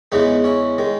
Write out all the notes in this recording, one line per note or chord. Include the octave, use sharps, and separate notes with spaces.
E2 C#3 E3 G#3 B3 D#4
C#4 E4
D#3 G#3